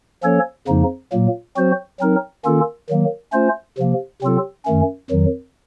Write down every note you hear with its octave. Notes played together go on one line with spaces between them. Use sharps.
F3 A#3 C#4 A4 C#5
F2 C#3 F3 A#3 D#4
A#2 F#3 A#3
F#3 C4 F#4 C5
F#3 C4 D#4 A#4
D#3 A#3 C#4 F4 A4
D#3 F#3 A#3
A3 C#4 F4 C5
C3 F3 A#3
C3 F#3 C4 F4 A4
F#2 D#3 A3 C#4
F2 D#3 F#3